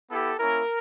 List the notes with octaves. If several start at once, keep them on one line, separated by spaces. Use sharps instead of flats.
B3 E4 G4 A4
A#3 C#4 E4 A#4